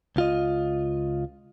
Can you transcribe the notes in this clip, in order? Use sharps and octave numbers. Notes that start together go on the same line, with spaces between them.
C#2 F4 D#5